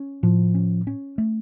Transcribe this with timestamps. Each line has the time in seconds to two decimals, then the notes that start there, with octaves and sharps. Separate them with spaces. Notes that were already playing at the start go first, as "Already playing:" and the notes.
Already playing: C#4
0.23 A2 F3
0.55 C#4
0.87 C#4
1.18 A3